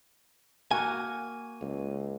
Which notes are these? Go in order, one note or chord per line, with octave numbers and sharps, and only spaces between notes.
A#3 F#4 G#5
C#2